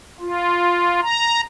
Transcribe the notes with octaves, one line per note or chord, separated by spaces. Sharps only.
F4
A#5